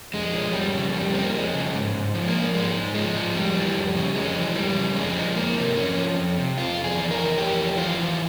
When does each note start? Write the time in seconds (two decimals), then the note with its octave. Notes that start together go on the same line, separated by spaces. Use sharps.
0.14 F2 G#3
0.34 F3
0.53 F2 G3
0.74 C#3
0.94 F2 G3
1.14 F3 C4
1.23 A#3
1.34 F2 G#3
1.54 C#3
1.75 G#2
1.94 G#2
2.14 F3
2.28 A#3
2.34 F3
2.54 G#2 G#3
2.75 G#2
2.95 F3 G#3
3.16 F3
3.35 F2 G3
3.55 E3
3.75 F2
3.96 C#3
4.16 F2 G#3
4.36 E3
4.55 F2 G3
4.75 C#3
4.96 F2 G#3
5.16 F3
5.36 F2 A#3
5.57 C3
5.76 F2 C#4
5.97 F3
6.17 F2
6.37 C3
6.57 F2 F4
6.77 F2
6.84 G#4
6.97 E3
7.11 A#4
7.18 E3
7.37 F2 G4
7.58 F2
7.77 E3 F4
7.98 E3